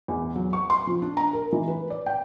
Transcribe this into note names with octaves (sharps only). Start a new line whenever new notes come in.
E2
F#3
C#6
C6
F3
D4
A#5
A#4
E3
B4
D5
G5